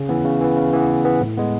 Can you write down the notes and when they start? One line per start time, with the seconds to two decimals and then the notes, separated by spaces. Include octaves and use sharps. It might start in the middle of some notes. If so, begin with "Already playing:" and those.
Already playing: C#3
0.09 E3 B3
0.25 C#3
0.41 E3 B3
0.57 C#3
0.73 E3 B3
0.89 C#3
1.05 E3 B3
1.21 A2
1.37 G#3 B3